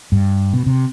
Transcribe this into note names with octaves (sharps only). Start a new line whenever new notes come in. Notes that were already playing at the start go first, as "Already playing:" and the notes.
G2
B2
C3